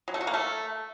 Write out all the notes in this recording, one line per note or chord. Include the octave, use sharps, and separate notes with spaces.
F#3
A3
F#4
A#3
A3